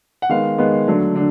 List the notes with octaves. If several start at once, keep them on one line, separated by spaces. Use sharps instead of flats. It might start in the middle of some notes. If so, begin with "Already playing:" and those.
F#5
D#3 G#3 B3 F5
D#3 G#3 B3
D3 F#3 A3
D3